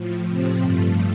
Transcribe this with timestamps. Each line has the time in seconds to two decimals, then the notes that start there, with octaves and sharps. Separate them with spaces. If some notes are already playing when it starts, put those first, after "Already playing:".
Already playing: A2 F3
0.26 A2 C3 F3 C4
0.61 G2 F3 A3